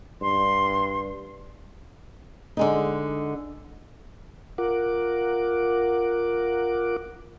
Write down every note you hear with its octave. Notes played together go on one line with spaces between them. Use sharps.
G2 C6
D3 G#3 D#4
F4 A#4 F#5 D6